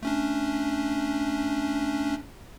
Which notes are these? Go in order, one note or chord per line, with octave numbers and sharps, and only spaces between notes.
A3 C#4 D4